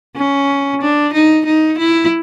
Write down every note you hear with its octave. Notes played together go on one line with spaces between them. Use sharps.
C#4
D4
D#4
D#4
E4